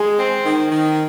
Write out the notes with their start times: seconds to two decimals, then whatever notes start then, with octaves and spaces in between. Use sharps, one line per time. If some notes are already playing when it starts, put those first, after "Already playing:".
Already playing: G#3 G#4
0.18 C4
0.45 D#3
0.71 D#3